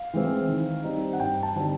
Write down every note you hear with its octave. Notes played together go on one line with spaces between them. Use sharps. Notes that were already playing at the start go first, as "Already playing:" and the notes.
Already playing: F5
E3 G#3 C4
D#3
G3 C4 D#4
F#5
G2 G5
A5
D3 G3 C4 D#4 A5